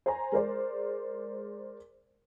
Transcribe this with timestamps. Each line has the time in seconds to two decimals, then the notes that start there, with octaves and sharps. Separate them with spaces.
0.06 C5 G#5 A#5
0.32 G#3 A#4 C5 D5